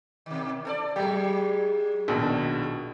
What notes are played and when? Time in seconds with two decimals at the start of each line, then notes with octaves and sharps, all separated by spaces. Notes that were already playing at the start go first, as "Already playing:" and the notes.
0.26 B2 D#3
0.65 A4 C5 D5
0.96 F#3 G#3 G4
2.08 A#1 B2 D#3